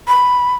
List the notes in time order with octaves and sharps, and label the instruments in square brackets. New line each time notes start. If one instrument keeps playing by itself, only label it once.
[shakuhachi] B5